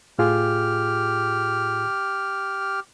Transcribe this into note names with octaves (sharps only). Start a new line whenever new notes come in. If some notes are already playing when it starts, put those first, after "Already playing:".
A2 F4 G4 G#4 F6